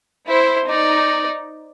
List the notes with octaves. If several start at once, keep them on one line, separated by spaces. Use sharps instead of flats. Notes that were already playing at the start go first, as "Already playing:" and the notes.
E4 C5
D#4 D5